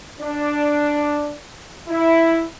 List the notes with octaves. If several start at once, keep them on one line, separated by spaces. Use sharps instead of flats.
D4
E4